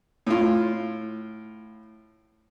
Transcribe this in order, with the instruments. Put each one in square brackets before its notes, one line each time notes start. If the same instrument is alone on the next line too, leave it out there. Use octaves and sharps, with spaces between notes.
[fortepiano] A2 F4